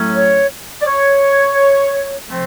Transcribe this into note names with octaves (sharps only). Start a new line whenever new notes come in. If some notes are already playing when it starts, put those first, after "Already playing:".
Already playing: A2 F#3 A3 C#4
C#5
D5
C#5
C3 F3 A3 C4 C5